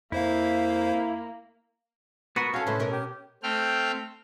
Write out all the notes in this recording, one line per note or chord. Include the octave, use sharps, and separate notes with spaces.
F2 A#3 E4 C5 F5
B3 F#4 A#4 B4
C#4 F#4 G#4 A4 F5
A2 C#3 A3 B4 C5
B2 B3 A#4
G4
A3 C4 G5 F6